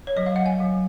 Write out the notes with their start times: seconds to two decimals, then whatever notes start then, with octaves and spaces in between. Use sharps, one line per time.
0.07 C#5
0.17 F#3 D#5
0.26 F5
0.36 F#5
0.46 G#5
0.60 F#3